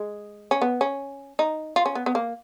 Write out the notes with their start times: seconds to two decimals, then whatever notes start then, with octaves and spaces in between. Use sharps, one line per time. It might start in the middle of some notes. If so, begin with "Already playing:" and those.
Already playing: G#3
0.51 C#4
0.62 B3
0.81 C#4
1.39 D#4
1.76 F4
1.86 C#4
1.95 B3
2.06 B3
2.15 A#3